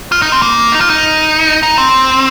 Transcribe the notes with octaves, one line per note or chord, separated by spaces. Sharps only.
F4
D#4
C4
A#3
D#4
F4
D#4
D#4
C4